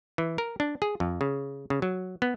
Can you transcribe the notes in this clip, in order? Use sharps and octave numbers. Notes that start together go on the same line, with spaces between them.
E3
A#4
D4
G#4
F2
C#3
C#3
F#3
B3